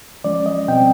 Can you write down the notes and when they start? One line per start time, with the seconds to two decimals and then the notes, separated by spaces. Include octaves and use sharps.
0.24 F3 G#3 C#4 D5
0.46 D#5
0.68 B2 G3 C4 G5